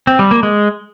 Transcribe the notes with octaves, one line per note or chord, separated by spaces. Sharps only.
C4
G3
A#3
G#3